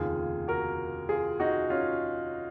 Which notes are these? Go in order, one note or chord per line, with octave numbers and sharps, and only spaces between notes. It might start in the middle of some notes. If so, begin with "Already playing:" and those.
Already playing: F1 D#2 C#3 F4 G#4
F#4 A#4
F4 G#4
D#4 F#4
C#4 F4